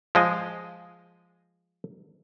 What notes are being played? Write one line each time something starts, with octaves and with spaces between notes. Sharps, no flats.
F3 G#3 D#5